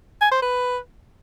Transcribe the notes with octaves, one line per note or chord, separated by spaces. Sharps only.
G#5
C5
B4